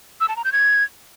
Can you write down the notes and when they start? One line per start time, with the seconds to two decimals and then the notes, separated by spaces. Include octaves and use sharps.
0.21 E6
0.29 A5
0.37 A#5
0.45 G6
0.52 G#6